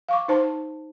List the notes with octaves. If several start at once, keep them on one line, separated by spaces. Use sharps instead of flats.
F5 C#6 D6
D#4 C5 A5 C6